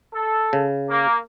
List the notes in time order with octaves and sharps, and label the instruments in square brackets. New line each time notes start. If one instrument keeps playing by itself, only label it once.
[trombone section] A4
[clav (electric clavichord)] C#3
[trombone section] A#3